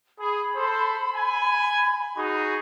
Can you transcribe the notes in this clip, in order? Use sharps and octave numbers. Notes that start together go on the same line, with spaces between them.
G#4 B5
A4 C5
G#5
D#4 F#4 G#4